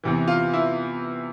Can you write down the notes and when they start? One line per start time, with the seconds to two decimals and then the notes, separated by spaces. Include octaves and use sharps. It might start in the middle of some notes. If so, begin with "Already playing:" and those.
0.04 E2 C3 E3
0.27 F4
0.54 E4